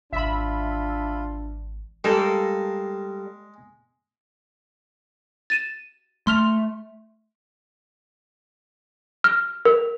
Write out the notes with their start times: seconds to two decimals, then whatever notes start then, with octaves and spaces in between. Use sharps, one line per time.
0.13 G#1 E3 D4 F4 E5 B5
2.04 G3 G#3 A#3 A4
5.50 A6 D#7 E7
6.27 A3 C6 F6 F7
9.24 F6
9.65 A#4